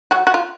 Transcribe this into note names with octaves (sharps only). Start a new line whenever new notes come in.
F#3 F#4
F#4
F4